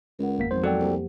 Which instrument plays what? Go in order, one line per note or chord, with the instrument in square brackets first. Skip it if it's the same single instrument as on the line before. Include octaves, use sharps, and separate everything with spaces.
[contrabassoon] C#2 [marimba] A#4 F#5
[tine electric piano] G#1 A#3 B6 [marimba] F2 B3
[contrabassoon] G#1 [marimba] F3 F#3 [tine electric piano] C5
[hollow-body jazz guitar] F#3 [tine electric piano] A4 D5 G5 [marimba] F#5
[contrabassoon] C2 [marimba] A#3 G4 C5